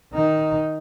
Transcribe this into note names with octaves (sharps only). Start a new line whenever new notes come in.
D#3 D#4